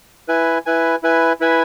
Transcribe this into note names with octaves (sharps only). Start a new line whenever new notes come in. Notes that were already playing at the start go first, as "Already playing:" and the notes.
E4 B4 G#5
E4 B4 G#5
E4 B4 G#5
E4 B4 G#5